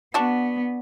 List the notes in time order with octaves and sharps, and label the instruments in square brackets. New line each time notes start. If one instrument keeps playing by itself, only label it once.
[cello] B3 [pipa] D4 F#4